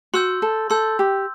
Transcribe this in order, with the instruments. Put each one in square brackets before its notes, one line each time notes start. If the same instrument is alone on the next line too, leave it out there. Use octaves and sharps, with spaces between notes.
[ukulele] F#4 [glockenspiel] C6 E6 G6
[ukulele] A4
[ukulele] A4 [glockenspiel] C6 E6 G6
[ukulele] G4